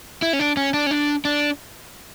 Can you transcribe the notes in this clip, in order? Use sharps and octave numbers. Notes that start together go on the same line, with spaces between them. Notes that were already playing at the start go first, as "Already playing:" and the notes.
E4
C#4
D4
C#4
D4
C#4
D4
D4